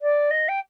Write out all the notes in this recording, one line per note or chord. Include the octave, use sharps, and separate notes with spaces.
D5
D#5
G5